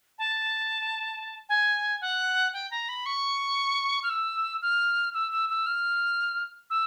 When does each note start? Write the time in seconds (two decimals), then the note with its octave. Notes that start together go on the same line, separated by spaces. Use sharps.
0.18 A5
1.49 G#5
2.01 F#5
2.54 G5
2.71 A#5
2.89 B5
3.06 C#6
4.03 F6
4.09 E6
4.62 F6
5.14 E6
5.32 E6
5.49 E6
5.66 F6
6.70 E6